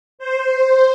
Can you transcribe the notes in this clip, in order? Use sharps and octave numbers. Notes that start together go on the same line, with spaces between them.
C5